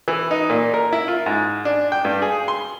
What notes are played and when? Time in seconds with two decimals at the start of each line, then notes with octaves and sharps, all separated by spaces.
0.08 E3
0.31 D#4
0.50 A#2
0.74 A#4
0.93 E4
1.08 F4
1.26 G#2
1.65 D4
1.92 G5
2.05 G2
2.22 G#4
2.48 C6